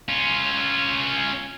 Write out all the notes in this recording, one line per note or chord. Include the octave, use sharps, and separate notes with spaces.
C#4 F4